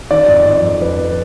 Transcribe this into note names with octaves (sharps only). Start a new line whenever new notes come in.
D#3 D5
F2
F2
F2
F2 B4